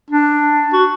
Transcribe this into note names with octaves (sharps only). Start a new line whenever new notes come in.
D4
F#4